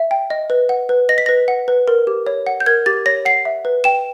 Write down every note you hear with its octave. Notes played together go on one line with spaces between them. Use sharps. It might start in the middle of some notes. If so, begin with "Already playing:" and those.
Already playing: E5
G5
D#5
B4
F#5
B4
D#5 A#6
B6
B4 A#6
F#5
B4
A#4
G4
C#5
F#5
G6
A#4 G#6
G4 A6
C#5 A#6
F#5 C7
E5
B4
G5 E7